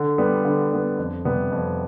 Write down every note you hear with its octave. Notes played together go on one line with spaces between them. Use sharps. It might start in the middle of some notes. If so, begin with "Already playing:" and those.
Already playing: D3
G3 B3
D3
G3 B3
F2
C3 G3 B3
F2